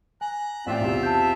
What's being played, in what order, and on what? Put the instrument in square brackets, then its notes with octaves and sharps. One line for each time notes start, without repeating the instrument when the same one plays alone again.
[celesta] G#5 [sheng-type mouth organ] A#5 F#6
[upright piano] A1 D5 G5 [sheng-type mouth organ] C4 F4 E5
[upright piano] B1 E2 C3
[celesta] A5 G6